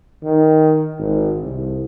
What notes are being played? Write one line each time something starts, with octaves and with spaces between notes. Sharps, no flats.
D#3
G#1
C2